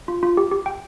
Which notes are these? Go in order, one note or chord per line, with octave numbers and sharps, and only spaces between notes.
F4
F4
G4
G4
G5